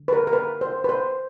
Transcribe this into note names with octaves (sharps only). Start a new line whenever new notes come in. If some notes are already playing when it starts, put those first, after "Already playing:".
Already playing: D3
B4
A#4
A#4
B4
C5
B4
C5